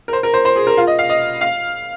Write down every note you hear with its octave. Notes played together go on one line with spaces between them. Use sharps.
A#4
C5
A#4
C5
C5
G#4
A#4
F4
D#5
F5
D#5
F5